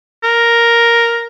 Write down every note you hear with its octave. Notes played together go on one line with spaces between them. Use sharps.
A#4